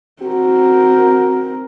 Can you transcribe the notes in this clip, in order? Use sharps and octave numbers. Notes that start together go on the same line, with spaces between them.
C4 F#4 A#4